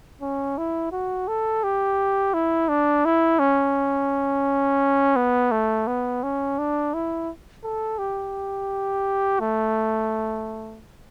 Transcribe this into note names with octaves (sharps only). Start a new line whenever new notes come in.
C#4
E4
F#4
A4
G4
E4
D4
E4
C#4
B3
A3
B3
C#4
D4
E4
A4
G4
A3